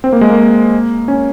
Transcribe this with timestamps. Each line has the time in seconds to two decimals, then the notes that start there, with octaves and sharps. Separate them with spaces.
0.04 C4
0.13 A#3
0.21 G#3
0.30 A#3
1.08 C#4